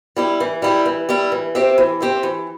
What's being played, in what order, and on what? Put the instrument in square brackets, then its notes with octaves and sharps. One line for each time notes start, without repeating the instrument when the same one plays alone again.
[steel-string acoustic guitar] G3 E4 G4
E3
G3 E4 G4
E3
G3 E4 G4
E3
C4 G4 C5 E5
E3
C4 G4 C5 E5
E3